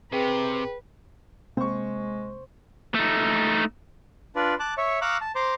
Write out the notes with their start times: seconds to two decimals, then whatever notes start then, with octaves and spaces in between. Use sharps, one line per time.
0.12 C3 G#4 B4 G5
1.57 C3 G#3 A#3 C4 C5 C#6
2.95 A3 D#4
4.36 D4 F4 B4 D5
4.60 A5 D6 F#6
4.78 C#5 E5 C#6
5.01 F5 A#5 C#6 D6 E6 F#6
5.21 A5
5.35 C5 A#5 C6 D6